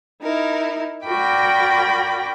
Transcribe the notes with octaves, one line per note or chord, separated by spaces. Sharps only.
D#4 E4 A#4
F#4 A#4 D5 G5 B5 D6